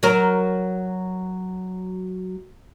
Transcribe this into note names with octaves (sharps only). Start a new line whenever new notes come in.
F#3 A#4